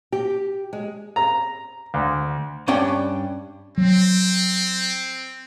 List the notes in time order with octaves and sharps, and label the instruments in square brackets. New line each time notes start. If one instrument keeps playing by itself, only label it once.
[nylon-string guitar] G4
G#3
[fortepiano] A#5
D2
[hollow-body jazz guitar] G2 C#4 D4 G5
[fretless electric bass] F#3 [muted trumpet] C4